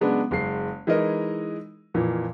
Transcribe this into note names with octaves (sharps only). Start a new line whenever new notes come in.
C#3 F#3 G#3 B3 D4
F#1 G#3 C7
E3 G#3 D#4 E4 A#4 D#5
F2 A#2 E3